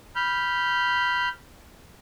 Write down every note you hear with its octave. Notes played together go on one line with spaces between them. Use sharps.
B5 F6 G6